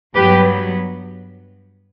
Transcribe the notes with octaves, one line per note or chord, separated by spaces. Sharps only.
G2 F#3 B3 G4 B4